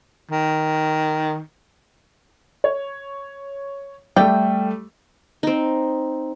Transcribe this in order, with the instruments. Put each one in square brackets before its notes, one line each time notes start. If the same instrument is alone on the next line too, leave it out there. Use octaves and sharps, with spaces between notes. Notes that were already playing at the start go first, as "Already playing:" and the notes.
[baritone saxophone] D#3
[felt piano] C#5
[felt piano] G3 A3 [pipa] D5 E5 G5
[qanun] C4 D#4